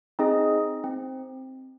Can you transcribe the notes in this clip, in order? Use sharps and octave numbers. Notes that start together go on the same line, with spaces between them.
C4 D#4 G#4 D#5
C4